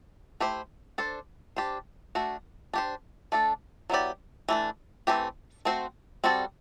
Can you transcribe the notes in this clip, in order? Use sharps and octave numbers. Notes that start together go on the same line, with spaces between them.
A3 E4 G4 C5
D4 A4 C5
D4 G4 C5
A3 D4 F#4
D4 G4 C5
A3 D4 A4
F#3 B3 E4 G4 D5
E3 A3 D4
E3 A3 C4 G4
A3 C4 F#4 C5
G3 C4 F#4 A4 D5